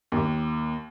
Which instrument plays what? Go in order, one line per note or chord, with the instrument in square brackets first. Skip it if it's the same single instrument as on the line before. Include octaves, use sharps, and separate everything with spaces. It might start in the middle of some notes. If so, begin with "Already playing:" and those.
[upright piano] D#2